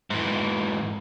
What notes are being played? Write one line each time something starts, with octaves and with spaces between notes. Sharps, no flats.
G#2 E3